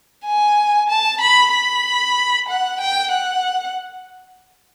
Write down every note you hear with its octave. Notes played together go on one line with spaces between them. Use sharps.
G#5
A5
B5
B5
F#5
G5
F#5